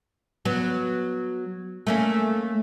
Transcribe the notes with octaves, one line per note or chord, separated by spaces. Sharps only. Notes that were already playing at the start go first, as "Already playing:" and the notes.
F#3 B3
A3 A#3 C#4